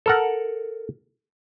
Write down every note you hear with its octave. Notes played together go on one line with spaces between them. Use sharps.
A4 A#4 F#5